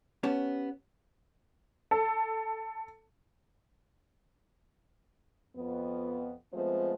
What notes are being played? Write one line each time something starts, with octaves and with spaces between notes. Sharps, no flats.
B3 C#4 G4 C#5 A5
A4
F2 B3
F3 G#3 A3 B3 C4 C5